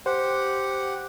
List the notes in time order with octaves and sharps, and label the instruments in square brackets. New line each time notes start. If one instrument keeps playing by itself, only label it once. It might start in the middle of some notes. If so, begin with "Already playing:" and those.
[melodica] G4 F#5 [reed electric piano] C5